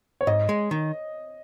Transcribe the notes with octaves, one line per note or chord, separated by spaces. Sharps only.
C#5
G#2 D#5
G#3
D#3